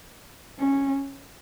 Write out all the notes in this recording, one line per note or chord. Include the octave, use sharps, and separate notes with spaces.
C#4